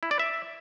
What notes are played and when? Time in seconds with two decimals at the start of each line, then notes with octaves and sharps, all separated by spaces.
0.03 E4
0.11 D5
0.19 E5